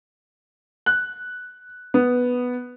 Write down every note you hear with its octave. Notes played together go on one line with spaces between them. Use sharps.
F#6
B3